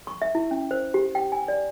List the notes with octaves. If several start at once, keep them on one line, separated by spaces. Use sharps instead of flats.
C#6
E5
E4
C#4
C5
G4
G5
G#5
D5